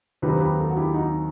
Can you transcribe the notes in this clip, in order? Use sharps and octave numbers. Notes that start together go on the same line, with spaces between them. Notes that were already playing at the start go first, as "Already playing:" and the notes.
D#2 D#3 F#3 C4 D#4 G4 B4
G4 B4
F#4 A4
F#4
E4 G4
D#4 F#4